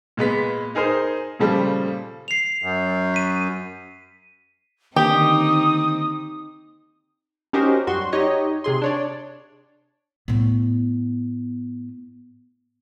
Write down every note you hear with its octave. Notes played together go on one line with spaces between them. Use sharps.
A#2 G#3 B3 B6
D#4 G#4 A#4 C5
A#2 C#3 F3 G3 A3
C7 F7
F#2
B6 D#7
D3 D#3 A#3 C4 D#4 G4 D#6
C#4 D#4 F#4 G4 A#4 C5
F#2 G3 F#4 C6
D#4 G4 C#5 D#5
C3 G#4 C6
D4 C#5 D5
A2 B3